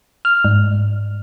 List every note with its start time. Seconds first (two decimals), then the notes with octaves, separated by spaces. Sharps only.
0.25 F6
0.45 G#2